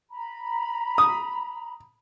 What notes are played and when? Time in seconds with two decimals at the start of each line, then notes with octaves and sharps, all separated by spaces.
0.10 A#5 B5
0.98 D#6